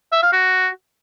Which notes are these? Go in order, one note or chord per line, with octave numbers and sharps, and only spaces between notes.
E5
F5
F#4